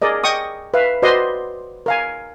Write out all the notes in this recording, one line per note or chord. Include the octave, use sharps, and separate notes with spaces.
G#4 A#4 D5 D#5
D#5 G5 C#6 D#6
B4 E5 F5
F#4 B4 C5 D5 D#5 C6
A#4 F5 G#5